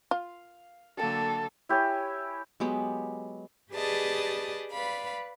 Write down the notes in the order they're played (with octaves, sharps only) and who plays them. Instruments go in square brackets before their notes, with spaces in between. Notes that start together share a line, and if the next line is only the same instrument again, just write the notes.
[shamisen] F4 [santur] F5
[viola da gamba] D3 F#3 A#3 [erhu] A4 [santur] F5 G5 A5
[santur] E4 G4 C#5 G#5
[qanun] F#3 G#3 B3 G4
[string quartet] G4 G#4 B4 D5 D#5 A5
B4 D5 F5 B5